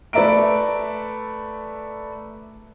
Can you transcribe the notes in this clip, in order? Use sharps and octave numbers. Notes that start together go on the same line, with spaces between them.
A3 B4 D5 E5 A#5 D7